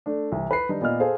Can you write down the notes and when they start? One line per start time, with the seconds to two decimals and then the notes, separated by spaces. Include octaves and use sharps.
0.06 A3 D4
0.32 C2 E3
0.51 B4 B5 C7
0.69 D#3 G3 D4 D#4
0.81 A#2 B3 D5 D#5 F6
1.00 G#4 A4 C5 F5